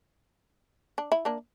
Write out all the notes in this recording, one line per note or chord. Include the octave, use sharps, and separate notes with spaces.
D4
E4
A#3 D4